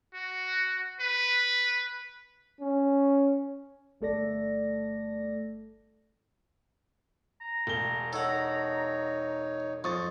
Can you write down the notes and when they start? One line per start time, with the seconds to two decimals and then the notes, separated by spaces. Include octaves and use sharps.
0.14 F#4
1.00 B4
2.60 C#4
4.01 G1 A3 A4 D5 A#6
7.41 A#5
7.67 E1 G7
8.13 D#4 A4 C#5 F#5
9.84 F2 C#6 D#6 A6